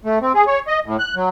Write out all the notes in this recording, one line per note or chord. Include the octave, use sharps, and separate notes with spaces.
A3
C4
G#4
C#5
D#5
A2
F#6
F#3